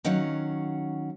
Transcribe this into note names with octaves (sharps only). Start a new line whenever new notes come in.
D#3 F#3 C#4 F5 F#5